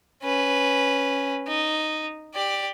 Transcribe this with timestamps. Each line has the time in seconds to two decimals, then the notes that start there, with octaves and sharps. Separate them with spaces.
0.23 C#4 B4
1.47 D#4
2.35 G4 D5